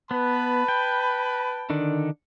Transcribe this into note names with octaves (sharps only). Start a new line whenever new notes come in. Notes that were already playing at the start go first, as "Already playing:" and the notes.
B3 B4 A5 B5
G5
D3 D#3 D4